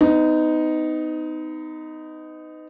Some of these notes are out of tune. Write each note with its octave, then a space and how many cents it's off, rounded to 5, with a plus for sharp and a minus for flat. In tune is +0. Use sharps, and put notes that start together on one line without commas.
B3 +40 D#4 +0